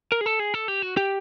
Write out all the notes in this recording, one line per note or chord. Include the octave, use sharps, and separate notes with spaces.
A#4
G#4
A4
G#4
A4
G4
F#4
G4